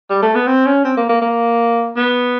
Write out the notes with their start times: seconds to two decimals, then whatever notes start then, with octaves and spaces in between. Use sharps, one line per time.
0.10 G3
0.22 A3
0.35 B3
0.47 C4
0.66 C#4
0.85 C4
0.97 A#3
1.09 A#3
1.21 A#3
1.96 B3